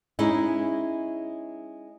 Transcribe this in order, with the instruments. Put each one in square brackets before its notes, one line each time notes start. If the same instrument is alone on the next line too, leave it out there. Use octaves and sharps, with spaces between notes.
[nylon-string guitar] G#3 C#4 D#4 E4